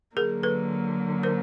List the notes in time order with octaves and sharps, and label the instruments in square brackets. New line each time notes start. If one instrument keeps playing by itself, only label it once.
[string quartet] D3 F#3 A#3 [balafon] G#4 A#4
[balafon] A4 B4
A#4 C5